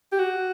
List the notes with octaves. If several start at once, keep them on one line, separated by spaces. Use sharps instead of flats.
G4
F#4